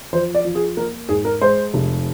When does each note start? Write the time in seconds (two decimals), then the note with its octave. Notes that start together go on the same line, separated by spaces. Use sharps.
0.13 F3 C5
0.35 D5
0.45 F3
0.55 G#4
0.77 A#3 A#4
1.09 G#2 G#4
1.25 A#4
1.41 G#3 C5
1.74 F1